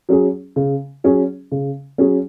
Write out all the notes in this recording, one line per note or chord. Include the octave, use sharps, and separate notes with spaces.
F#3 C#4 G#4
C#3
F#3 C#4 G#4
C#3
F#3 C#4 G#4